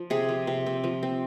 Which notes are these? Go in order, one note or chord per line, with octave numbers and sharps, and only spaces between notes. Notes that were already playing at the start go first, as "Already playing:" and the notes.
Already playing: F3
C3 G#4
F3
C3
C4
F3
C4